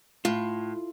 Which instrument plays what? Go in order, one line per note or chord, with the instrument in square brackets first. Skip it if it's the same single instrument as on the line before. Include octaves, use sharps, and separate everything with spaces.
[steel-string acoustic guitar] A2 [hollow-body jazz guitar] F4